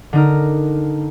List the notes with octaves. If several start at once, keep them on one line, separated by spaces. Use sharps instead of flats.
D3 D#4 A#4